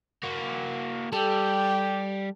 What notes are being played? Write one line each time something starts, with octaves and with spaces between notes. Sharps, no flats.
A#3 F#4
G3 G4 A4